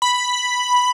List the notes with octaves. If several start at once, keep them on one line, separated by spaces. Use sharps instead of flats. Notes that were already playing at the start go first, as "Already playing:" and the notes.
B5